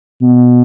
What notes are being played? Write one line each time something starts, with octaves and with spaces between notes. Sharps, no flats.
B2